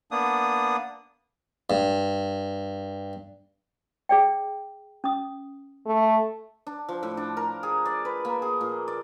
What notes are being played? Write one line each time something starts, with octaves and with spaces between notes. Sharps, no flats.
A#3 B3 D4 D#6
G2
G#4 D5 G5
C#4 D#6
A3
D4
F3
A2
D4
A#4
G#4
D5
B4
A#3
G#4
A#2
D5